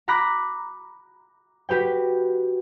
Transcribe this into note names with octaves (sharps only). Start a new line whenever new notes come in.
A#5 B5 D6 F#6 A#6
F#4 G4 B4 G5